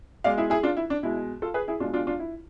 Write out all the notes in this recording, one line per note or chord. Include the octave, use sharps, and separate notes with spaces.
B2 G#3 D5 F5
E4 G#4
E4 G#4
D4 F4
E4
D4
B2 G#3 E4
F4 A4
G#4 B4
E4 G#4
B2 G#3 D4 F4
D4 F4
D4 F4
E4